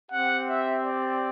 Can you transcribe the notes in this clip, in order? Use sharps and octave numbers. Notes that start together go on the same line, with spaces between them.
C4 G4 F#5
E5
D5